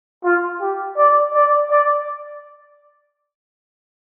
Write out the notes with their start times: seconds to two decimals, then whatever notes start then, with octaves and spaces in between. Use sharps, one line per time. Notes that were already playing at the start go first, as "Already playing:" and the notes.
0.24 F4
0.61 G4
0.97 D5
1.34 D5
1.70 D5